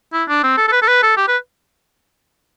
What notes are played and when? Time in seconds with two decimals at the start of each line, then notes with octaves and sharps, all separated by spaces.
0.13 E4
0.28 D4
0.43 C4
0.57 A4
0.68 A4
0.72 B4
0.82 A4
0.88 B4
1.03 A4
1.17 G4
1.28 B4